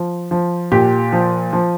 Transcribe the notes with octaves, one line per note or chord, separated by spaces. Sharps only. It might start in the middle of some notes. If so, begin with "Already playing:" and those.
Already playing: F3
F3
A#2 G4
F3
F3